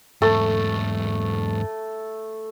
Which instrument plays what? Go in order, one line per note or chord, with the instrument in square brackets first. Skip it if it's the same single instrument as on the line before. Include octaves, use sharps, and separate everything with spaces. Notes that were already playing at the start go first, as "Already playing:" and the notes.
[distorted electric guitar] E2 G#2 [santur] A3 A4